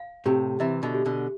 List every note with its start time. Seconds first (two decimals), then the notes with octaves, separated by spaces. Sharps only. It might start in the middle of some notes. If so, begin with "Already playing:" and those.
Already playing: F5
0.26 A2 C3 G4
0.60 C3 E3 E5
0.83 B2 D3
0.94 G4
1.06 B2 D3